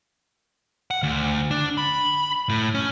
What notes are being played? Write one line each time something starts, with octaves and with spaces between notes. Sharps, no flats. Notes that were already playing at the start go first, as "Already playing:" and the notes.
F#5
D2
D4
B5
A2
C#4